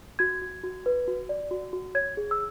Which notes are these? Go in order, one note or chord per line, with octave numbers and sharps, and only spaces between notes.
F#4 G#6
F#4
F#4
B4
F#4
D5
F#4
F#4
C#5 G#6
G#4
E6